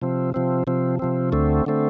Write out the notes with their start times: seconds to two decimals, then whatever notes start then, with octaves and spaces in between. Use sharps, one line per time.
0.02 C3 F3 C4
0.34 C3 F3 C4
0.67 C3 F3 C4
0.99 C3 F3 C4
1.32 D2 D3 A3 C4
1.66 D3 A3 C4